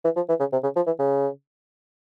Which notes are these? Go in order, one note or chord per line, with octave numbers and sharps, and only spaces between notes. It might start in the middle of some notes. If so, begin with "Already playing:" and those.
E3
F3
E3
C#3
C3
C#3
F3
E3
C#3